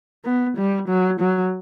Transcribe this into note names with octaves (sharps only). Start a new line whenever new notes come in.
B3
G3
F#3
F#3